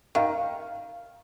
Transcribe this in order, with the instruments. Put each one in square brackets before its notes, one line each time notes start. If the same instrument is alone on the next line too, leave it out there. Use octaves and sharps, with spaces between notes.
[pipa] D#3 [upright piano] F5